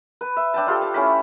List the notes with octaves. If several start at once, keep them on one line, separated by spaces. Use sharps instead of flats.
B4
E5
D4 G5 A5
D4 F4 G4 A4
A5
A3 C#4 E4 B5